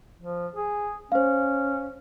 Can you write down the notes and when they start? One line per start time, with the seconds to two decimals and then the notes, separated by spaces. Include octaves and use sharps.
0.22 F3
0.56 G#4
1.12 C#4 C5 F5